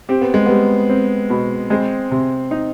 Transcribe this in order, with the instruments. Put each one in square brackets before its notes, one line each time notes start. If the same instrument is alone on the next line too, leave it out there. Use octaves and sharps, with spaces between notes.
[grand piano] C4 [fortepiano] G4
[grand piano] B3
G#3
[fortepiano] G3 [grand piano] B3
[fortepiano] C4
B2
[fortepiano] G#3 [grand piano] C4
[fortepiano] C3
D#4